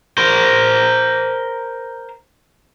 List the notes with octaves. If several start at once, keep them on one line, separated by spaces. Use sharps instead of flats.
A#4 C5